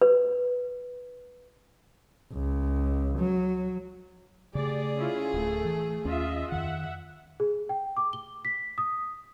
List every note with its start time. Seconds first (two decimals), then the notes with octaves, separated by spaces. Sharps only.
0.02 B4
2.32 C#2
3.18 F#3
4.55 C#3 A3 G4 G#4 D5
4.96 C#4 E4 F4
5.34 D1 A3
5.65 E3
6.05 D#2 C#4 F4 D#5 E5
6.52 F2 D#3 E5 F#5
7.40 G#4
7.69 G5
7.97 D6
8.13 G7
8.45 B6
8.78 D#6